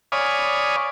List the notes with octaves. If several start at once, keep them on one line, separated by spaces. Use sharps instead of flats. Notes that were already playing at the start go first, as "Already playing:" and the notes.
C#5 D5 F5 G#5 B5 D#6